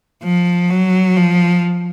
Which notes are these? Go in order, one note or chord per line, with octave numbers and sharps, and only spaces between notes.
F3
F#3
F3